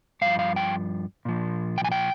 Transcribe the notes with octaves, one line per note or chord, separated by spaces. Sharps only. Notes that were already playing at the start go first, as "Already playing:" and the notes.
G2 F3 F5
F5
G5
A#2 F3
G5
G#5
G5